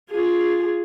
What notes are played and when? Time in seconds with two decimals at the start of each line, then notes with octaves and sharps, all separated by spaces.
0.10 F4 G#4